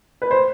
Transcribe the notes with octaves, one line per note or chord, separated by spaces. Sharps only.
B4
C5